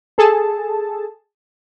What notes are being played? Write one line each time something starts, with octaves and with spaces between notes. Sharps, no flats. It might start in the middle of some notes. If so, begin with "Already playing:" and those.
G#4 A4 A5